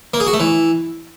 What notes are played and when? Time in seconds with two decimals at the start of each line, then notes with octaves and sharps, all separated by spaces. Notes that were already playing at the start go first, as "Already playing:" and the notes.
0.14 A#3
0.20 G#4
0.27 F#4
0.33 A3
0.40 E3